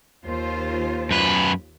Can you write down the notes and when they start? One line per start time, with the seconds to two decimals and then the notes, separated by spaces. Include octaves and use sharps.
0.24 D#2 F4 C5
1.11 F#2 B4